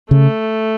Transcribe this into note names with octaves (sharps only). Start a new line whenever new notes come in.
C#3 A3